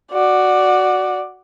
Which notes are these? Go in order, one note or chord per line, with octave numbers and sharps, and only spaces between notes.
F#4 D5